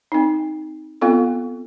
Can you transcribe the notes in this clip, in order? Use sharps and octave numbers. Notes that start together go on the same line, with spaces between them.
C4 D#4
B3 C4 F4 A4